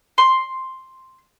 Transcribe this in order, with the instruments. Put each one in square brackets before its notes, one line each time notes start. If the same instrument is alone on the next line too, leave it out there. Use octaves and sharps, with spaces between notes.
[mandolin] C6